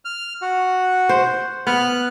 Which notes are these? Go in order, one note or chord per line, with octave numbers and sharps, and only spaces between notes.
F6
F#4
C5
B3 F6 F#6